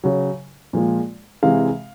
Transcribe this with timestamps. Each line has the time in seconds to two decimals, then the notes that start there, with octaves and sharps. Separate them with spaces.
0.04 C#3 F#3
0.73 A#2 F3 G#3
1.43 C3 E3 G#3 F5